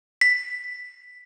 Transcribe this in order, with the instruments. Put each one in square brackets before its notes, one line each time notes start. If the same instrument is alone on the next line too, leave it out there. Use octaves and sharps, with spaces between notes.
[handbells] B6